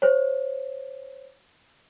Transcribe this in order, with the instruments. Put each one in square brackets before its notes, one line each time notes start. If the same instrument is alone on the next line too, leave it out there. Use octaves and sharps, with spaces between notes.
[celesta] C5 C#5